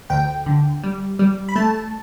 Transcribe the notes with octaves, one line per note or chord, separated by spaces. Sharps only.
D2 G5
D3
G3
G3
B5
A3 A5